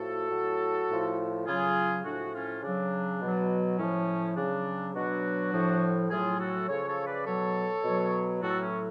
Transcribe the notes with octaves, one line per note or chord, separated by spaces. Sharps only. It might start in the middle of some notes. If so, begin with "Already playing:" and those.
Already playing: A2 F3 F#4 A4
A2 F#3
A2 F3
C#3 F#3 F4 G#4
A2 F3 D4 F#4
C#4 F4
C#3 F#3 D4
B2 F#3
A2 F3 C#4
C#3 F#3 D4
B2 F#3 D4 F#4
A2 F3
A2 F#3 F4 G#4
F#4 A4
C#3 F3 A4 C#5
A4 C#5
B4 D5
B2 F#3 A4 C#5
B2 F#3
A2 F#3 F#4 A4
C#4